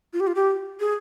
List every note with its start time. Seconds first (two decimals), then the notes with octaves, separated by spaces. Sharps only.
0.13 F4
0.20 G4
0.27 F4
0.35 G4
0.80 G#4